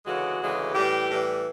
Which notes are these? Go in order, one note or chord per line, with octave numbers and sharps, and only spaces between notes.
D2 C#3 E3 G#3 F#4
D2 C#3 E3 G#3
A2 E3 G3 G4
A2 E3 G3